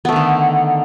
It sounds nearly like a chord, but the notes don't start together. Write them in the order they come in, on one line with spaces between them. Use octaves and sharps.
B3 A3 D#3 D3